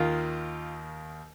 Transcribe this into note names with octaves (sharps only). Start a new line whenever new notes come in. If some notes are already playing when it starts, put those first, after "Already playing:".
Already playing: D#2 D#3 A#3 F4